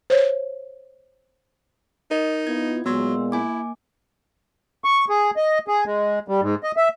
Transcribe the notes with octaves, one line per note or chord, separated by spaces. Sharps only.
C5 C#5
D#4 A#4 D#5
B3 E4 F4 G#6
A#2 F#3 G#3 B3 C6 E6
A#3 E4 G#5 D6
C#6
G#4
D#5
G#4
G#3
G3
G#2
D#5
E5